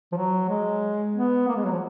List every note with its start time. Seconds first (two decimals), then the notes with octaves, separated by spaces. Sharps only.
0.12 F3
0.17 F#3
0.49 G#3
1.15 B3
1.48 A#3
1.56 G#3
1.64 F#3
1.72 F3